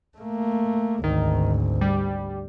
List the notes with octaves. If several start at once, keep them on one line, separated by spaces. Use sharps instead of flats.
A3 A#3
G#1 D2 D#3
G3